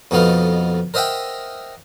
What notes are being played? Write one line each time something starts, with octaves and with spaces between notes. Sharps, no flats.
F2 B2 A3 B3 D#4 F5
A#4 C5 D#5 E5 F#5 G5